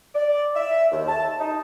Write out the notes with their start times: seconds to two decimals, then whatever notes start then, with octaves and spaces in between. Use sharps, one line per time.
0.15 D5
0.56 E5
0.92 D#2
1.08 A5
1.40 D#4